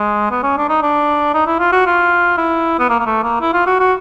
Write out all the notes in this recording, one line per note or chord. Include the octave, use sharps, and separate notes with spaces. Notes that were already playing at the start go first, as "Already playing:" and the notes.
Already playing: G#3
B3
C#4
D4
D#4
D4
D#4
E4
F4
F#4
F4
E4
B3
A#3
A#3
A3
A#3
E4
F4
F#4
F#4